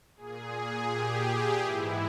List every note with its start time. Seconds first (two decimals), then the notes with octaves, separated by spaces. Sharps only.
0.16 A#2 G#4
0.88 G4
1.60 G#2 E3 E4